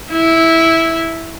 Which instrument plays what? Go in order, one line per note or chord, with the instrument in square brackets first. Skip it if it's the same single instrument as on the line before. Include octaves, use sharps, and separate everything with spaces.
[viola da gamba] E4